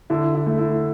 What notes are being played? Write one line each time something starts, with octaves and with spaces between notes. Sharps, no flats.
D3 E4
E4
A3
E4